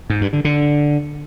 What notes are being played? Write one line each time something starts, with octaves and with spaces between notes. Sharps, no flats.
G#2
G2
D3
D3